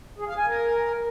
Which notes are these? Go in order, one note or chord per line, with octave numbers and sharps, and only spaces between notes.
G#4
F5
G#5
A#4